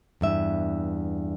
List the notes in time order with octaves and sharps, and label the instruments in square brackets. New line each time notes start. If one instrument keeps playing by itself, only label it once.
[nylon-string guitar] E2 G2 E5